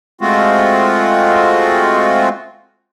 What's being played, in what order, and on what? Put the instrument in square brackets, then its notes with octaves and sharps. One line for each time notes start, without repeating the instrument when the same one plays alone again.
[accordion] G#3 A3 C4 F4 F#4